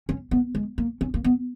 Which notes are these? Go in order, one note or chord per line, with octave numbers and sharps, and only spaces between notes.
C#4
B3
G#3
A#3
C#4
A#3
B3